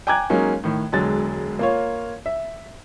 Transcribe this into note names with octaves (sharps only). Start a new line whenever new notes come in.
G5 G#5 A#5 D6 F#6 G#6
F#3 G#3 A#3 C#4 D#4
A2 D#3
E1 D3 F#3 G#3 A6
A#3 F4 C#5
E5